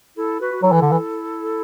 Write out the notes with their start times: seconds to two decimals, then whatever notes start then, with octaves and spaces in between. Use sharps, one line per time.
0.17 E4 A4
0.40 F#4 B4
0.51 F#4
0.62 F#3 E4 A4
0.72 E3
0.82 D3
0.91 E3